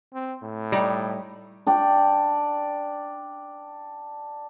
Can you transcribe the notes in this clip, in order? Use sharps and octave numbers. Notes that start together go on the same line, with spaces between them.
C4
A2
G3 D#4
D4 D5 G5